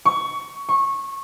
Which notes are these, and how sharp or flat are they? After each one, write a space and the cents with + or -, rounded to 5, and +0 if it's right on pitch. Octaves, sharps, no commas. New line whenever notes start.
C#6 +15
C#6 -20